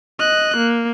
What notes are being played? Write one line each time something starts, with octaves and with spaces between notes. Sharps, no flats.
D#5 F#6
A#3